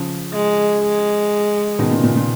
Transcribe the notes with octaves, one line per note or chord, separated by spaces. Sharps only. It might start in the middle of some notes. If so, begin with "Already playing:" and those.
Already playing: C#3 F3
G#3
G#3
B2 D#3
A#2 C#3
A#2 C#3
A#2